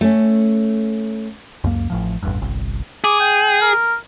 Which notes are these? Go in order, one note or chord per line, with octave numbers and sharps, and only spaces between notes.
A3 C#4
C#2 F#2 A#3
A1 A2 F3
A1 E2 G2
G1 C2
G#4 D6
G5
A#4